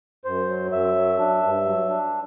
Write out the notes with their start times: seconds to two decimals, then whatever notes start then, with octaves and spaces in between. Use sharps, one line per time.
0.25 F#2 C5
0.48 F#3
0.72 F#2 E5
0.95 F#3
1.19 D4
1.42 G2
1.65 F#3
1.89 D4